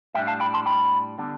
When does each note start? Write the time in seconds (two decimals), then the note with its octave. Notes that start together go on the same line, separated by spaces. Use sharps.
0.14 A2 G3 D4 E5 G5
0.27 F5 A5
0.40 G5 B5
0.54 A5 C6
0.66 G5 B5
1.18 D3 G3 B3 D4